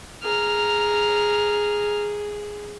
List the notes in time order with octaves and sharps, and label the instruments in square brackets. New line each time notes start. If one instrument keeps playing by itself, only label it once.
[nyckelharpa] G#4 [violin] A#5 F6